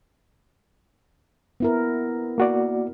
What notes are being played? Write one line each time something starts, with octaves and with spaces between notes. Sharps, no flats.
B3 E4 A#4
A#3 F#4 D5